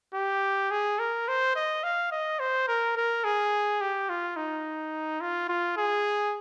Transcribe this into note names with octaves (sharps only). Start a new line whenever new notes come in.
G4
G#4
A#4
C5
D#5
F5
D#5
C5
A#4
A#4
G#4
G4
F4
D#4
F4
F4
G#4